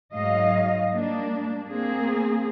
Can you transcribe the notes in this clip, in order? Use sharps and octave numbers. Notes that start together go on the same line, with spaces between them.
G#2 F#3 D#5 F5
G3 A#3 D4
A#3 C4 G#4